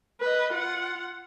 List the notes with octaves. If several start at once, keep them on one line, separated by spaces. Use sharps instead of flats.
B4 D#5
F4 F#5